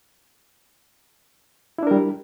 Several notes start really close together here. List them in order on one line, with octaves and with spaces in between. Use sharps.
E4 D4 A#4 G3